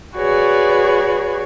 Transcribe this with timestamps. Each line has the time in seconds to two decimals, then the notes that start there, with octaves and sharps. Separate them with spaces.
0.15 F#4 G#4 B4 C#5 D5